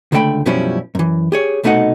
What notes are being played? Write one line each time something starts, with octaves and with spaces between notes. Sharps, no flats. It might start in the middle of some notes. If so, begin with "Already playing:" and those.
C#2 D3 A3 D4 G5 B5
F#2 B2 F3 G3 C#4 E4
F#2 E3
G4 G#4 C#5
C2 B2 A3 D#4 D#5 F#5